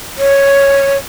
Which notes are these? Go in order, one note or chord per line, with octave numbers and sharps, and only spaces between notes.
C#5